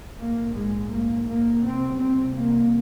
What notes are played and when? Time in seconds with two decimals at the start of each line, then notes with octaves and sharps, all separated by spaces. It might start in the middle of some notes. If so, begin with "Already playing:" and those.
0.19 A#1 G#2 A#3
0.55 G#3
0.92 A#3
1.27 A#3
1.64 C2 C3 C4
2.00 C4
2.36 A#3